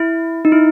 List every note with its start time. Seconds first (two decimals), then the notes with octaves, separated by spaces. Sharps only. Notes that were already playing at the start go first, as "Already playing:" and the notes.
Already playing: E4
0.45 D#4
0.52 E4